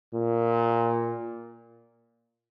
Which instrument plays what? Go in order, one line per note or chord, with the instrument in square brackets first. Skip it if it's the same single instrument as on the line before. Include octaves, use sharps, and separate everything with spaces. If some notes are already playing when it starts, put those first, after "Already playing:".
[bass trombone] A#2